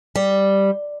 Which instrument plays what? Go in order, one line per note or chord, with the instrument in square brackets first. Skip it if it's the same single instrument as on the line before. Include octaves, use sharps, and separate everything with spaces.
[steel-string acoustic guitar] G3